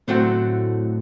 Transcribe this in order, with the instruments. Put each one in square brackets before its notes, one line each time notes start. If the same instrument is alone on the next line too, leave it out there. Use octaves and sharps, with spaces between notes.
[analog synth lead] A2 [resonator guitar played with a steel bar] D3 F#3 A3 C4 F#4